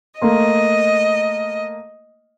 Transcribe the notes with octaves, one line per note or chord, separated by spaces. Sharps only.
A3 A#3 D#5 C6